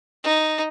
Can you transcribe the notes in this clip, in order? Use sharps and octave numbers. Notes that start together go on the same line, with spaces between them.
D#4